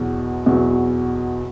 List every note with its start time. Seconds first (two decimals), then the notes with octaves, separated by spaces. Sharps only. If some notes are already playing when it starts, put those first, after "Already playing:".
Already playing: E2 B2 F#3
0.46 E2 B2 F#3